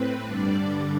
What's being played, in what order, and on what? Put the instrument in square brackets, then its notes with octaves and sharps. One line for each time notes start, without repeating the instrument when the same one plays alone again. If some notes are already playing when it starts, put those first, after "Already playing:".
Already playing: [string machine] A2 C4 B4
G2 D3 G3 D4 D5